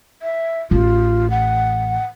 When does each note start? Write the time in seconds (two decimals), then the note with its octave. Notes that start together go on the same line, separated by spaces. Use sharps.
0.22 E5
0.71 A1 F4
1.30 F#5